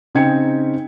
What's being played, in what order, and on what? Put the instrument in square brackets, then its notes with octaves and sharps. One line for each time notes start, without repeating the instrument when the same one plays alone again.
[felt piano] C#3 C4 D#4 G5 G#6 C#7